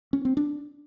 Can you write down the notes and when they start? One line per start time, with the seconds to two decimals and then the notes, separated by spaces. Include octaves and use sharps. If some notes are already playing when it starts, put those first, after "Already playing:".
0.13 C#4
0.25 C4
0.37 D4